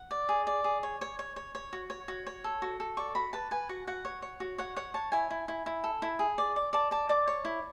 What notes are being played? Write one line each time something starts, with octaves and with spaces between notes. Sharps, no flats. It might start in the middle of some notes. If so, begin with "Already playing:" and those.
Already playing: F#5
D5
G#4
D5
G#4
C#5
C#5
C#5
C#5
C#5
F#4
C#5
F#4
C#5
A4
F#4
A4
D5 C#6
F#4 B5
B4 A5
B4 G#5
F#4 F#5
F#4 F#5
C#5
C#5
F#4
C#5 F#5
C#5 F#5
C#5 A5
E4 G#5
E4
E4
E4
A4
E4
G#4
D5
D5
D5 A5
D5 A5
D5 D6
C#5
E4